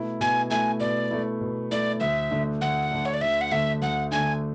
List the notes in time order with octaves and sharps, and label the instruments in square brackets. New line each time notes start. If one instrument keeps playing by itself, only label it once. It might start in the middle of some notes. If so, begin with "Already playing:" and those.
Already playing: [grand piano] B2 A3 E4
[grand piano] B2 [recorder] G#5
[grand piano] A3 E4 [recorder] G#5
[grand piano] B2 [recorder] D5
[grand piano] A3 E4
B2
[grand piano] A3 E4 [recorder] D5
[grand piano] D2 [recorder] E5
[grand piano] D3 A3 D4
[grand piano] D2 [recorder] F#5
[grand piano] D3 A3 D4
[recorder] C#5
D5
[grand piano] D2 [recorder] E5
[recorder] F#5
[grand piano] D3 A3 D4 [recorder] E5
[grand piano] D2 [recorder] F#5
[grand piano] D3 A3 D4 [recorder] G#5